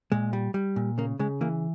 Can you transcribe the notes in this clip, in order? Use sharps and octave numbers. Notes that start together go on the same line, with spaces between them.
A#2 G#3
G3
G3
A#2
C#3 A#3
C#3 G#3
E3 A#3